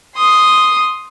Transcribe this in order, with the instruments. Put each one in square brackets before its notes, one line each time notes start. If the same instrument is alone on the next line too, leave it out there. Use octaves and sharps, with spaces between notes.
[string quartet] C6 D#6